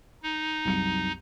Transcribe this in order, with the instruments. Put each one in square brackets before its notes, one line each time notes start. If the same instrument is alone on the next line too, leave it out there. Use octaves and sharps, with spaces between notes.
[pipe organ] D#4
[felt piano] C2 F#2 C#7